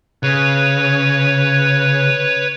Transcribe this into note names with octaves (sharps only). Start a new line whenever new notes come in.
C#3 B4 C#5